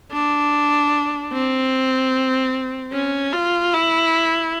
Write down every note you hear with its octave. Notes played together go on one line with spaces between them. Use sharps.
D4
C4
C#4
F4
E4